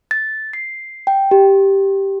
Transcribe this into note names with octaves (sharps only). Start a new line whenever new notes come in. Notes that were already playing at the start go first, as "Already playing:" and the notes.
A6
C7
G5
G4